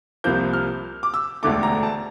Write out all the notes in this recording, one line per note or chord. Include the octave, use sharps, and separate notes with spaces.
C2 C3 F3 A#3 G6
F6
D6
E6
E1 D2 D3 A3 D6
A#5
A5